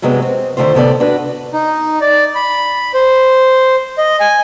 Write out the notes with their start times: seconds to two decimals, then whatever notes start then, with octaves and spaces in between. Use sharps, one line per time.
0.02 G2 C3 F#3 G#3 B3
0.22 C4
0.57 D3 D#3 A3 F4 C5
0.74 A2 C3 B3 A4 D5
1.00 D4 F#4 B4
1.53 D#4
2.01 D5
2.35 B5
2.94 C5
3.98 D#5
4.20 G#5